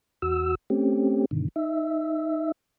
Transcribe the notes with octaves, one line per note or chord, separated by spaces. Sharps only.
E2 F#4 E6
A3 C4 C#4 G4
G2 B2 D3 D#3
D#4 E5